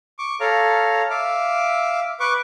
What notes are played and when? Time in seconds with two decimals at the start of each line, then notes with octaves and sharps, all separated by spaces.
0.19 C#6 D6
0.40 A4 C#5 F5 A#5
1.10 E5 F5 D6
2.20 B4 C#6 D6